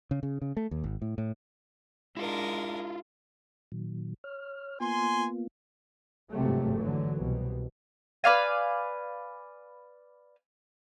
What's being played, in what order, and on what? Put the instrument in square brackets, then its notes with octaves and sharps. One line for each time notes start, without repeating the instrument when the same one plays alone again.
[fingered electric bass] C#3
C#3
C#3
A3
D#2
G#1
A2
A2
[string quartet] G#3 D4 A#4 [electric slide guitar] E4 F4
[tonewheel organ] A#2 D#3 F#3
C#5 F6
[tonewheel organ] A#3 B3 F4 [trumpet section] G#5 C6
[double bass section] G1 F2 G#2 C3 F#3 A3
D3 E3 F#3
C2 B2
[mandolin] B4 D5 F5 G#5